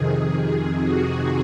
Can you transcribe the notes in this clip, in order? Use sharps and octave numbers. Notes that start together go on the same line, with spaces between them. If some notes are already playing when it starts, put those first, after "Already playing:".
Already playing: F2 C3 D#3 G#4
F#4